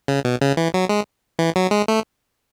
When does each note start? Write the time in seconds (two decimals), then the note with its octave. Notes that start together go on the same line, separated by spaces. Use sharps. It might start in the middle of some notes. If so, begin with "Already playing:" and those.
0.08 C#3
0.25 B2
0.41 C#3
0.57 E3
0.74 F#3
0.89 G#3
1.39 E3
1.56 F#3
1.71 G#3
1.88 A3